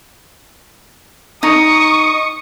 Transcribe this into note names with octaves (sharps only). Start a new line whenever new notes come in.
D#4 C#6 D#6